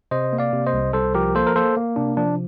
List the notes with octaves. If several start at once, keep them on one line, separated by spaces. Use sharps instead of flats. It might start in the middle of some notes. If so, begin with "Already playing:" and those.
C3 C5 D#5
A#3
D5 F5
C3
C5 D#5
C2
C2 A4 C5
F3 G4 A#4
A#3 A4 C5
A#4
A#3 A4 C5
A#3
C3 D4
F3 D4